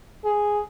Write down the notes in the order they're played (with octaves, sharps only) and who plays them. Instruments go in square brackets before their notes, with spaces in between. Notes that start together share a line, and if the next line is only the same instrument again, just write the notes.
[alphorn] G#4